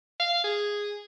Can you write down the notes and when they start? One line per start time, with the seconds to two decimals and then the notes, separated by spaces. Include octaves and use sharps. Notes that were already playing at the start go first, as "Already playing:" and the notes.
0.20 F5
0.44 G#4